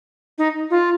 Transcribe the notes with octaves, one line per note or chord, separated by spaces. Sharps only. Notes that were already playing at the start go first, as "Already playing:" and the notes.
D#4
F4